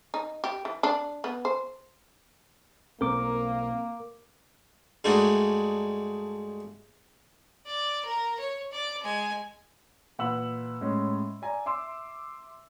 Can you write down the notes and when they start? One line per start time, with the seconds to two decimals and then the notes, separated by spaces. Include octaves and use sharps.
0.14 D#4
0.44 G4
0.65 E3
0.83 D4
1.24 B3
1.45 C5
3.01 B1 A#3 C4 A#4 D6
5.04 G2 G#3 A3 D4 D#4 F#4
7.66 D5
8.05 A#4
8.39 C#5
8.72 D5 D6
9.03 G#3 G#5
10.19 A#2 E3 F#5 B5 E6 F#7
10.81 A2 G#3 C#4
11.42 D5 G#5 A#5
11.66 E5 C6 D6 E6